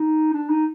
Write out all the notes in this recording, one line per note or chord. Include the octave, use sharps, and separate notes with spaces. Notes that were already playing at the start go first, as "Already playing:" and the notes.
Already playing: D#4
D4
D#4